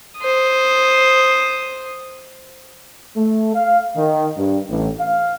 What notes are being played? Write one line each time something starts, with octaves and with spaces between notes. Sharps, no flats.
C5 D#6
A3
F5
D#3
G2
A1
F5